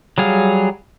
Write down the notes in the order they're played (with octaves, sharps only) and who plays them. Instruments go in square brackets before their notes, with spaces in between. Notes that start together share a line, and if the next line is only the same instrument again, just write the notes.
[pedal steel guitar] F#3 G3 G#4 F5